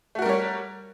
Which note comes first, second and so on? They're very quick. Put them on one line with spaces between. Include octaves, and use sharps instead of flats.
A3 F#4 A#4 G3 C#5